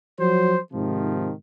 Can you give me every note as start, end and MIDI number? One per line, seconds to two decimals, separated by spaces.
0.19 0.58 53
0.19 0.58 54
0.19 0.58 72
0.72 1.33 44
0.72 1.33 48
0.72 1.33 51
0.72 1.33 53